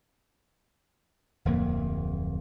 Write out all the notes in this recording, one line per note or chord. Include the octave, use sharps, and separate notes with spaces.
D1 F2 A#3